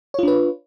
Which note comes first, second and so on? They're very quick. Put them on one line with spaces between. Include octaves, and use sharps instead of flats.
C#5 F4 D4 B4